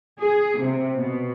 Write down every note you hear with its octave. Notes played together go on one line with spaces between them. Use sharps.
G#4
C3
B2